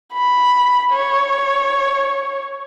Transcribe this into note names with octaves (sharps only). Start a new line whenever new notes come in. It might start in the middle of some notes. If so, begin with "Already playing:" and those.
B5
C#5